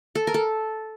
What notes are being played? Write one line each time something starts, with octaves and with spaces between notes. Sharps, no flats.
A4
A#4
A4